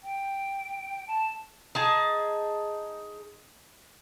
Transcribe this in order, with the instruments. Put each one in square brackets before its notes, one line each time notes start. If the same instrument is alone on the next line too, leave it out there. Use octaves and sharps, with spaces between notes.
[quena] G5
A5
[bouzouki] D#4 G#4 A5